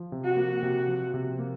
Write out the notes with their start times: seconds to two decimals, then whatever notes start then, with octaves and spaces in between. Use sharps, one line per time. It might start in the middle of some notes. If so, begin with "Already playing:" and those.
Already playing: F3
0.12 C3
0.24 F#4
0.37 A#3
0.62 C3
0.88 F3
1.14 C3
1.39 A#3